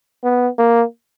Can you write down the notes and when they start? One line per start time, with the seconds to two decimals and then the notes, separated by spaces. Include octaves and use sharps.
0.24 B3
0.58 A#3